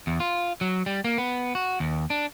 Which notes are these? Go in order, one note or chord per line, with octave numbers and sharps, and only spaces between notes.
E2
F4
F#3
G3
A#3
B3
F#4
D#2
D4